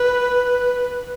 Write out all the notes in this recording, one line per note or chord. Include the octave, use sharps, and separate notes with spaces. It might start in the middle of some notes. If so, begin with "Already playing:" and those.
Already playing: B4